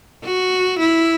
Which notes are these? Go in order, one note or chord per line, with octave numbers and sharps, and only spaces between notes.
F#4
E4